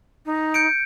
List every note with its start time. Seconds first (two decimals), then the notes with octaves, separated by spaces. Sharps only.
0.25 D#4
0.54 G6 C#7 D7